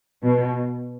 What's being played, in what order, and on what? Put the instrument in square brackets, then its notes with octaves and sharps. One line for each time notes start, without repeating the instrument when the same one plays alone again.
[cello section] B2